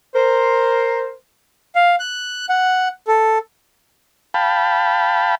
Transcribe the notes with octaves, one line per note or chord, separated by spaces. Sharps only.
A#4 C5
F5
F#6
F#5
A4
F5 G5 A5 B5